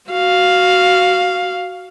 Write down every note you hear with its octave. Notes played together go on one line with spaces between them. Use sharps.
F#4 F5